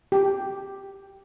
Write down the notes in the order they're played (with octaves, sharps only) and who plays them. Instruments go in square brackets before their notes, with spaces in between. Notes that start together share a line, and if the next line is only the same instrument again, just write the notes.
[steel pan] G4